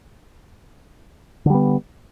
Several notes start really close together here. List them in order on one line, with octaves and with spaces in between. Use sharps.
D3 G3 B3